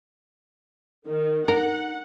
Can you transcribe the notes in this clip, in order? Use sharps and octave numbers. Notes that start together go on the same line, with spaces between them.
D#3
D#4 A#4 F#5